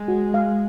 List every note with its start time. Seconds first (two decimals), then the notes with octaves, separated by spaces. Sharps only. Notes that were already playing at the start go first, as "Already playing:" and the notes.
Already playing: G#3
0.08 F#4
0.34 F5